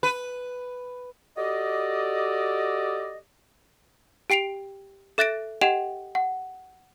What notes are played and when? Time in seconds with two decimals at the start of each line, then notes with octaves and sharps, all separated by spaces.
0.03 B4
1.36 F#4 G4 A4 D5 D#5
4.30 G4 G5 C7 D7 F7
5.18 A4 E5 F#6 A6 A#6 D7
5.61 G4 D#5 F#5 G5 E7 F7
6.15 F#5